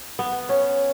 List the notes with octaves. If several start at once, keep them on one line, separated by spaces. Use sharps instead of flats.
B3
C#4